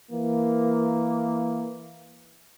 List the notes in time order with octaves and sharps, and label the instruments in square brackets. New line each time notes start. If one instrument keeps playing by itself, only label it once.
[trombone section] E3 A#3